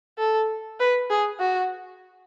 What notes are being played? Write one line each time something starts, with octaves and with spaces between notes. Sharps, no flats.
A4
B4
G#4
F#4